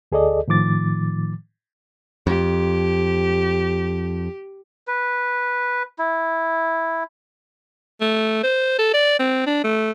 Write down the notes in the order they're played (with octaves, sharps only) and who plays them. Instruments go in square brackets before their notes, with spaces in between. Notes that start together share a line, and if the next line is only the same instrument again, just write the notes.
[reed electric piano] D2 G#4 A4 D5 D#5
A2 D#3 F3 D6 A6
[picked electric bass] F2 [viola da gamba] G4
[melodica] B4
E4
[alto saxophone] A3
C5
A4
D5
C4
D4
A3